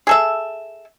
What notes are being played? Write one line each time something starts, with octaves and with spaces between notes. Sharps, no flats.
G#4 A4 E5